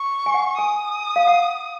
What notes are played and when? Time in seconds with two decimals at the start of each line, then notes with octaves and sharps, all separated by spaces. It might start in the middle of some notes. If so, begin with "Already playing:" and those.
Already playing: C#6
0.26 G#5
0.34 F#5
0.58 G#5 D#6
1.16 F5
1.27 F#5